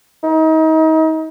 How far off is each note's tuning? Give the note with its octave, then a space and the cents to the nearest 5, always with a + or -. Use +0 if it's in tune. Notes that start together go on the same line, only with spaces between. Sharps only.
D#4 +35